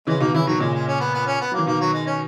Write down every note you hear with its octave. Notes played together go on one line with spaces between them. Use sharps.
C#3 E3 G#3
B2 D#3 A#3
C#3 E3 E4
B2 D#3 F#3
A#2 C#3 G#3
G#3
C#4
B3
B3
C#4
B3
F#3 A#3
E3
B2 D#3 A#3
F#3
G#3
C#4